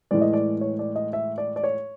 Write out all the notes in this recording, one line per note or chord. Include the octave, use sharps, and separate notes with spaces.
A2 E3 G#3 D5
D#5
D5
C#5
D5
D#5
E5
D5
D5
C#5